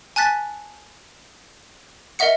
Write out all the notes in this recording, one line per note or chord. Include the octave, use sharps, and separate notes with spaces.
G#5 A5 F#6 A6 B6
A#4 D#5 E5 F#5 C#7